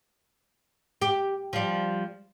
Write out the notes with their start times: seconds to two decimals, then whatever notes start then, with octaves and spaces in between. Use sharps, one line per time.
1.02 G4
1.53 F3 G3